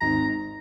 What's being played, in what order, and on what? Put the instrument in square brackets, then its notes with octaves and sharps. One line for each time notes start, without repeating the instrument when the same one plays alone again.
[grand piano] G#1 G#2 [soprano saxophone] A#5